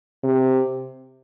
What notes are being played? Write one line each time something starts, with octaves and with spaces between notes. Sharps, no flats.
C3